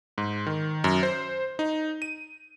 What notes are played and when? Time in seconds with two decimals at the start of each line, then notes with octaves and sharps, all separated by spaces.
0.18 G#2
0.46 D#3
0.84 F#2
1.03 C5
1.59 D#4
2.02 D#7